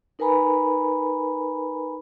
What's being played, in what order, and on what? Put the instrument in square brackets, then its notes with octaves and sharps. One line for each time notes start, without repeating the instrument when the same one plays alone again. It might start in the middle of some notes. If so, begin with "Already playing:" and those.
[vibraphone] D#4 A#4 B4 G#5 A#5 B5